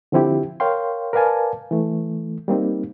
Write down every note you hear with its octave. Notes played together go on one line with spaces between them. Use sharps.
D3 F3 C4 E4 G4
A#4 C#5 F5 G5 C6
A#4 B4 D5 F5 G#5 A5
E3 A3
G3 A#3 C4 D#4